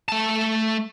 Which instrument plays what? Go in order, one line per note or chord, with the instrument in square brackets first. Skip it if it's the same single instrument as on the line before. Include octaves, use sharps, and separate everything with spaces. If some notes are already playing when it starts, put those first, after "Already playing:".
[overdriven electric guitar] A3 A5